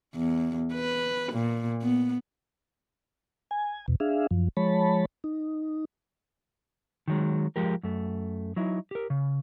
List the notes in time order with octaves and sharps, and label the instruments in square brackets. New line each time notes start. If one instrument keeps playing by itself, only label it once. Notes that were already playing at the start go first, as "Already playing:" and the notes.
[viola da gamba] E2
B4
A#2
B3
[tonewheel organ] G#5
E2 B2
D4 G#4 E5 F5
F#2 F3
F3 G#3 C#5 A5 B5
D#4
[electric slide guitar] D#3 F#3 G#3
F3 G#3 G4 A#4
F#2 A3
F#3 D#4 E4
G4 A#4
C#3